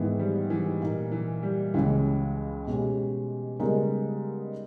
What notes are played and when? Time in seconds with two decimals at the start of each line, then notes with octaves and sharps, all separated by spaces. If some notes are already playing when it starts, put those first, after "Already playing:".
Already playing: G#2 D#3 E3 G#3 B3 E4
0.19 G3
0.50 E3
0.81 A#2 A#3 D#4
1.11 E3
1.43 G3
1.74 C#2 C#3 E3 G#3 C#4
2.67 B2 G#3 C#4 G4
3.59 C#3 G3 G#3 B3 D#4 A#4